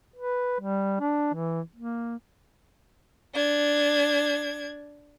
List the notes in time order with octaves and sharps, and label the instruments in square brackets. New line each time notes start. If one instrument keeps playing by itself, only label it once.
[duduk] B4
G3
D4
E3
A#3
[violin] D4 G#6